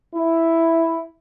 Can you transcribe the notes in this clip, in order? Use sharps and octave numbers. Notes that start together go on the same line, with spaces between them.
E4